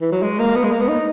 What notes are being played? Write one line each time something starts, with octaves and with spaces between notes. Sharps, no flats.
E3
F#3
G#3
A#3
B3
G#3
A#3
B3
D#4